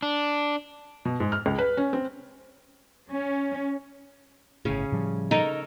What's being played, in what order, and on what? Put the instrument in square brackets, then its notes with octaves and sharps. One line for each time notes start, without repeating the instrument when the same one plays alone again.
[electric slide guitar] D4
[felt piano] B2
G#2
F6
C#2
B4
C#4
C4
[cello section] C#4
[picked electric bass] G1 A2 [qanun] C#3 C#4
[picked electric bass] A2 F3 G3
[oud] D#4 [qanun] A4 A#4 C#5